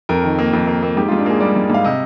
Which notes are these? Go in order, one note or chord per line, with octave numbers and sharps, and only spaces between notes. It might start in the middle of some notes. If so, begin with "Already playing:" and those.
F2 A#4
D#3
A#3
F2
A#3
A#3
G#2 G4
F4
G#2
D4
A#3 G#4
G3 D5
G#2
G#2 F5
C3 D#5